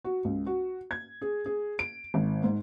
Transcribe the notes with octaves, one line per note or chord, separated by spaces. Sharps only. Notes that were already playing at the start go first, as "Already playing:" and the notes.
F#4
C#2
F#4
G#6
G#4
G#4
D7
G#1
G#2